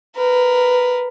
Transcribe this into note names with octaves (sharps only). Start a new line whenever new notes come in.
A#4 B4